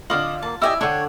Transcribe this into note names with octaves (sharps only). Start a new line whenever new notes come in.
D3 F4 D#5 F5 D6 F#7
A#3 A5
E4 G4 D5 D#5 G#5 E6
D3 D4 C#5 G5 C#6